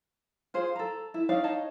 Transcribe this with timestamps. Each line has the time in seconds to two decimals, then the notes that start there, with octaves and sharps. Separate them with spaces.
0.54 F4 G#4 C5
0.76 A4 A#5
1.14 E4
1.29 C#4 D#4 D5 F5
1.44 D#4 C#5 A5